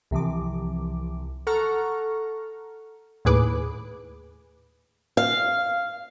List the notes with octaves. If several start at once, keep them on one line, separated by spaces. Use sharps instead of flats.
C2 C3 E3 F3 D6
A4 F#5 A#5 C#6 F6
D#2 A2 G#4 B4 D6
F5